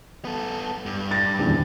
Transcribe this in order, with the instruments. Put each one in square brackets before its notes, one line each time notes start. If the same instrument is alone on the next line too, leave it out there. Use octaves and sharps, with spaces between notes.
[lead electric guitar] B3 A4
G2
[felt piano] A6 A#6
D#1 E2 D3